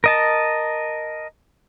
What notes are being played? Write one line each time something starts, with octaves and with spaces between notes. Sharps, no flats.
A#4 D#5 A5